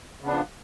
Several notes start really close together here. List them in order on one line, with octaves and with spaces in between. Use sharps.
C#3 B3 D4 F3